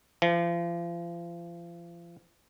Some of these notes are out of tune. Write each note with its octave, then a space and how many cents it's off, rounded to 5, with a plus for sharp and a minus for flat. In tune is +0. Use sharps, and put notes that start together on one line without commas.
F3 -35